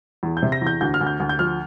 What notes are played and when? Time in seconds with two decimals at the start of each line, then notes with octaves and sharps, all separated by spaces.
0.23 E2
0.37 G6
0.43 C3
0.52 A#6
0.62 E2
0.67 G6
0.81 D2 G6
0.94 F6
1.01 D2
1.07 G6
1.20 D2
1.29 G6
1.39 F3 F6